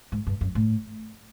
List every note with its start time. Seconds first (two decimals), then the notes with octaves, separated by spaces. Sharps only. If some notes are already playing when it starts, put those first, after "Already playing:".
0.12 G#2
0.27 G2
0.41 F#2
0.55 A2